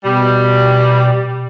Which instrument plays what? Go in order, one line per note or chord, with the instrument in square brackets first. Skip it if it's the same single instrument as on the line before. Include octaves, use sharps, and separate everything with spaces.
[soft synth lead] B2 [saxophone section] G3